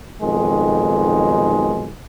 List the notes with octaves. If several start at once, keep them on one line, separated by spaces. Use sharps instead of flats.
B1 F2 D#3 G#3